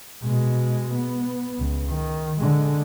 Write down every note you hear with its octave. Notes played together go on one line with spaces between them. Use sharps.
B2 G#3
B3
C#2
D#3
D3 G#3